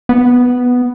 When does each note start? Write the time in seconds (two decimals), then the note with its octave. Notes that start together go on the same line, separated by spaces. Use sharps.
0.09 B3